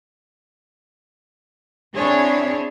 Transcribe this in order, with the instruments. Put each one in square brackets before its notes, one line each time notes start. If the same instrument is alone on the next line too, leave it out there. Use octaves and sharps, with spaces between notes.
[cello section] C4 D4 E4 G#4 C#5